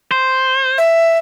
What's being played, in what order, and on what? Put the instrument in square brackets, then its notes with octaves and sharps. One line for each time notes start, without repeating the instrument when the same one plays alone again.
[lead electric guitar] C5
[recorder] E5